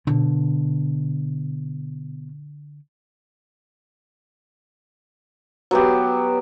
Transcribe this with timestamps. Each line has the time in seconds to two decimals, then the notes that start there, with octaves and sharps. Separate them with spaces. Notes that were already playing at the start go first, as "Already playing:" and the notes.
0.07 B2 D3
5.71 F#3 B3 G4